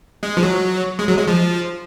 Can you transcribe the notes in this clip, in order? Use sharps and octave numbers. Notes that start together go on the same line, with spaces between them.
G#3
F3
F#3
G#3
F#3
G#3
F3